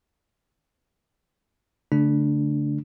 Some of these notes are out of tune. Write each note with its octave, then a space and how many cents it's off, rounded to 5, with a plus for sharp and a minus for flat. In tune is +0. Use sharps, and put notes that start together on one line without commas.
D3 -45 A3 +0 D4 +0